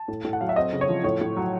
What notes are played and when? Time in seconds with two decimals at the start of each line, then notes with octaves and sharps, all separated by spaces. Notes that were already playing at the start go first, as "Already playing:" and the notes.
Already playing: A5
0.08 A2
0.25 A2
0.33 F#5
0.41 F#3 F5
0.49 E5
0.56 C4 D#5
0.73 C#3
0.81 C#5
0.89 F3
1.04 A2 C#5
1.21 A2
1.37 F#3